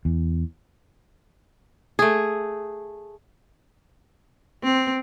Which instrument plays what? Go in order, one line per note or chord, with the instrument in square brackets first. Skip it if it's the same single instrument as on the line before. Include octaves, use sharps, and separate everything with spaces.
[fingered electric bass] E2
[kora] A3 G#4
[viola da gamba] C4